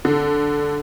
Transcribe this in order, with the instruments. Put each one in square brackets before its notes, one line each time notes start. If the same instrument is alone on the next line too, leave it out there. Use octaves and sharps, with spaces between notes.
[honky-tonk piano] D3